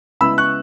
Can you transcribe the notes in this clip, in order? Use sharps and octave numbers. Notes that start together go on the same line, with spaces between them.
C#3 G#3 B3 E4 B5 E6
C#6 F#6